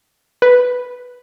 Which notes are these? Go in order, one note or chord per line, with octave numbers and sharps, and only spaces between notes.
B4